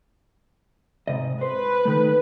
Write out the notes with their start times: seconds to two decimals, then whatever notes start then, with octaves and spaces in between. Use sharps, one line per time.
1.08 G#2 C3 D#5
1.41 B4 C5
1.85 D#3 A3